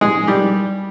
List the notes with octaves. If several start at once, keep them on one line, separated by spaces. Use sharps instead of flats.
G#3 G#4
G3 G4